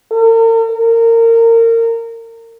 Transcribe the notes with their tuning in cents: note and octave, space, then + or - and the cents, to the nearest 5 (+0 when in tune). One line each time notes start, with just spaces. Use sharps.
A#4 -45
A#4 -25